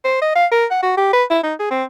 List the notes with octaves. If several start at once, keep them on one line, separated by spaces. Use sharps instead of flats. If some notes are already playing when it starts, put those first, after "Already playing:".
C5
D#5
F5
A#4
F#5
F#4
G4
B4
E4
D#4
G#4
C4